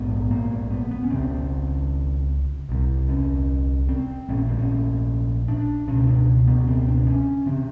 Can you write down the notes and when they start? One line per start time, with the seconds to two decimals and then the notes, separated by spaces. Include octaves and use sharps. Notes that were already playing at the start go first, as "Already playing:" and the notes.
Already playing: A#1 G#2 B3
0.31 A#3
0.70 B3
0.91 B3
1.04 C#4
1.10 C#2 C#3 C4
2.69 C2 C3
3.09 C#4
3.89 C4
4.29 A#1 A#2 C#4
4.48 C4
4.59 C#4
5.48 D4
5.88 C#2 B2 C#4
6.07 D4
6.48 B3
6.67 C4
6.88 D4
7.07 C#4
7.46 C#3 C4